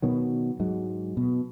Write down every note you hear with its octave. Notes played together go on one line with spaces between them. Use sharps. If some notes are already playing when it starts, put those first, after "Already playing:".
B2 D#3 F#3
G#2 F#3 G#3
B2